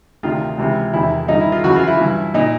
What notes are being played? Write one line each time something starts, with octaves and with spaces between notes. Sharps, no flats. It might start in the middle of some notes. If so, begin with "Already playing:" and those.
D2 C3 D#3 F4
C#2 C3 E3
E2 C3 D#3 E4
G2 D#3 D#4
E4
F4
F#2 C#3 E3 F#4
F4
E4
G2 E3
A#2 D#4